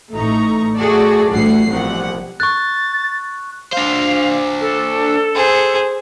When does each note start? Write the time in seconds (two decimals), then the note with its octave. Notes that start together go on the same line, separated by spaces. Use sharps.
0.13 A1 A3 D#4 A#5 C#6
0.78 A3 F#4 G#4 A4 D5
1.31 A1 D2 A2 G3 F#5 C7
1.69 C2 B2 F3 F#5
2.40 C#6 F#6 A6
3.73 D4 C5 F5
4.61 A4
5.35 G#4 C5